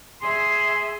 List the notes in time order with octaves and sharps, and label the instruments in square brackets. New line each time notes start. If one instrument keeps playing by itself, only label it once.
[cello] G#4 E5 [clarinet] C6